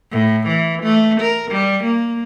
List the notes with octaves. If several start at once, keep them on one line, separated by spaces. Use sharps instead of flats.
A2
E3
A3
A#4
G3
A#3